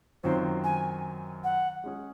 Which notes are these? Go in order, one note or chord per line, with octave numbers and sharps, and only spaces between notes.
F#2 D#3 F#3 C4 F4 C5
G#5
F#5
G#3 C#4 G#4